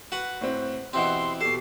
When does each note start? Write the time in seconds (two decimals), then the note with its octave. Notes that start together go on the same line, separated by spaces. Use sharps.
0.12 F#4 B4 F#5
0.41 A2 C4
0.93 B2 E3 C4 G4 F#5 C6
1.41 B2 G4 A4 C7